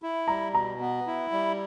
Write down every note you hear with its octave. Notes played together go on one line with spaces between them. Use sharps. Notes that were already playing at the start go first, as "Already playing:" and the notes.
E4
G3 A#5
B2 A#5
B3
E4
G3